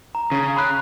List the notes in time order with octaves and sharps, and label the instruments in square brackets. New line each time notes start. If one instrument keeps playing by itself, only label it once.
[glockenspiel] A#5
[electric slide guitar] C#3
[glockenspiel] B5 F#6